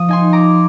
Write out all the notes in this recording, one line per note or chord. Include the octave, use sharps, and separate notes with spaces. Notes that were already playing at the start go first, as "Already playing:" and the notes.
Already playing: F3 D#6
D#4 G#5 C6
A#5 D6